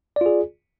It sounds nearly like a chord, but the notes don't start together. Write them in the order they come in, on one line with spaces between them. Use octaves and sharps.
D5 F4 G#4